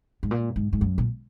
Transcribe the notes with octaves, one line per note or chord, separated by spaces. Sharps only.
G#2
A#2
G#2
G#2
F#2
A#2